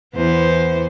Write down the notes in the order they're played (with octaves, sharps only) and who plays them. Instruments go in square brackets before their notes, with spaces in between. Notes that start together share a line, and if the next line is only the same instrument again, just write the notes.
[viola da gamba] E2 B3 C5